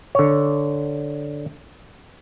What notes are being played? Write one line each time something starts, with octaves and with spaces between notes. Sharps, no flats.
D3 C#5